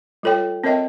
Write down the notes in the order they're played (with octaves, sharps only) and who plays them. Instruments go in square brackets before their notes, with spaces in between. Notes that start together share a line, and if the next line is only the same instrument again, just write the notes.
[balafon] G3 F4 A4 C#5 G5
C4 A#4 C#5 D#5 E5 G5